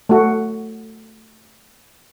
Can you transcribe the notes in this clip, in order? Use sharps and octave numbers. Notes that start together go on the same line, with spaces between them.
A3 F#4